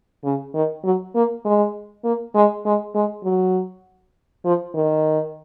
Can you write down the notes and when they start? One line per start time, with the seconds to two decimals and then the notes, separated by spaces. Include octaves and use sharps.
0.25 C#3
0.54 D#3
0.84 F#3
1.15 A#3
1.45 G#3
2.04 A#3
2.35 G#3
2.65 G#3
2.95 G#3
3.24 F#3
4.45 F3
4.75 D#3